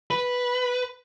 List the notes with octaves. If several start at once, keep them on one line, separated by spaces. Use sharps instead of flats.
B4